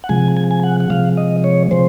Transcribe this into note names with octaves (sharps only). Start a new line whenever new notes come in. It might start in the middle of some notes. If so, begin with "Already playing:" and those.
F#5
C3 F3 G#3 G#5
G#5
G#5
F#5
F#5
C3 F3 G#3 F5
D#5
C#5
C3 F3 G#3 C5